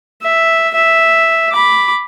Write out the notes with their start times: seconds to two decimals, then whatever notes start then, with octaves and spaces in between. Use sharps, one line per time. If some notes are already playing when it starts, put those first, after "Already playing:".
0.22 E5
0.75 E5
1.52 B5 D6